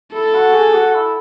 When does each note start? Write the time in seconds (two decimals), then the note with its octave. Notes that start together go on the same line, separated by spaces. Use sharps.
0.13 E4 A4
0.34 F#4
0.54 G#4
0.74 F#4
0.95 E4